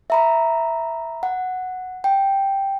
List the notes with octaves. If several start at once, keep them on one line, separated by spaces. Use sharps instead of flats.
E5 A#5 B5
F#5
G5